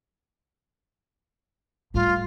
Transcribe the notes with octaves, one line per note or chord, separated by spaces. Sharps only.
A2 G3 F4